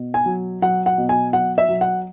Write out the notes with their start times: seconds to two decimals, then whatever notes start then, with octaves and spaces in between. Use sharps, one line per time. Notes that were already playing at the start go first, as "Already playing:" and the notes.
Already playing: B2
0.14 G#5
0.26 F#3
0.62 F#3 F#5
0.86 F#5
0.98 B2
1.09 G#5
1.33 F#3 F#5
1.58 E5
1.69 F#3
1.81 F#5